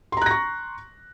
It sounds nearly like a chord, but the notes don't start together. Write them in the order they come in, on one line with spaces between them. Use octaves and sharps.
C6 A#5 F#6 A#6 C#6